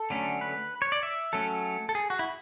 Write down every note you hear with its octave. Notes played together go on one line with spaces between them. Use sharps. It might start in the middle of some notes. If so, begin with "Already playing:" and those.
Already playing: A4
D3 F#3 A3 C#4
B4
C#5
D5
E5
F#3 A3 C#4 A4
A4
G#4
F#4
E4